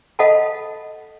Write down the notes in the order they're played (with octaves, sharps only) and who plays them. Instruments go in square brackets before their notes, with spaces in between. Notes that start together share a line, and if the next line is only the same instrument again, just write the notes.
[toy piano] A4 D#5 F5 F#5 A5 B5